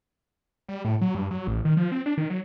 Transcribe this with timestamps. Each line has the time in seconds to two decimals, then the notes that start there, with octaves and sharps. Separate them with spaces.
0.69 G3
0.85 A2
1.01 F#3
1.15 G2
1.31 F#3
1.47 A1
1.65 D#3
1.77 F3
1.92 C4
2.06 D4
2.18 D#3
2.30 F#3